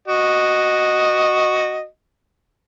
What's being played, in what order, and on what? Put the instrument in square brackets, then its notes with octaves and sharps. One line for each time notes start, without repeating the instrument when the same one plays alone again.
[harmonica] F#4 D#5